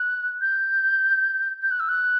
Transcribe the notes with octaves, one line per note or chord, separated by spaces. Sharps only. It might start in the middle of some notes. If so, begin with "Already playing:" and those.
Already playing: F#6
G6
G6
F#6
E6
F#6